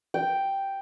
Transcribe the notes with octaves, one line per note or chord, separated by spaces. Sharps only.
G5